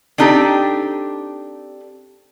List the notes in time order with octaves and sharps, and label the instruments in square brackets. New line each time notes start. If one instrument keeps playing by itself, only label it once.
[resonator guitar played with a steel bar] C4 D4 D#4 G4 A4